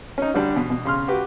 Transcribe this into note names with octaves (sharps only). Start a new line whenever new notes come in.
C#4 D#4
D3 G3 D4
B2
B2
C#3 C6 F6
F#4 G4 B4